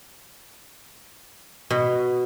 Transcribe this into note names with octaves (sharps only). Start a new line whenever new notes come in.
B2